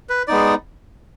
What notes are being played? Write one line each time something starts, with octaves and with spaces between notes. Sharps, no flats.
B4
G#3 B3 D#4 D5